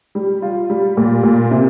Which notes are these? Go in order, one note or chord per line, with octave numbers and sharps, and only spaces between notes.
G3
F4
G3
A#2
A#2
C3